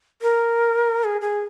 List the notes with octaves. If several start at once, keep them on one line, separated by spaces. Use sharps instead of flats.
A#4
G#4
G#4